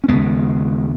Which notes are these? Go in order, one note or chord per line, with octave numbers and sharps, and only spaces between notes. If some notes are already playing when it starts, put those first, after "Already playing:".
C#4
D#2 C#3 G#3 B3